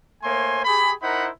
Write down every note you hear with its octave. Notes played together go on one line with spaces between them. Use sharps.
A3 A#3 C5 C#5 G#5 C6
G4 G#4 B5
D#4 E4 A#4 C5 F#5 B5